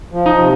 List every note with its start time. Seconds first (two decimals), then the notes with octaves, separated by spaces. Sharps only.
0.13 F3
0.26 D#4
0.39 C3